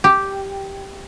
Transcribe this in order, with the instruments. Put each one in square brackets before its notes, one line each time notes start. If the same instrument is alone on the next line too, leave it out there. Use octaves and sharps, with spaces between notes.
[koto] G4